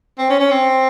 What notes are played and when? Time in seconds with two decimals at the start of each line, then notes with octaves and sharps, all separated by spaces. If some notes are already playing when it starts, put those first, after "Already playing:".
0.19 C4
0.30 C#4
0.40 C#4
0.51 C4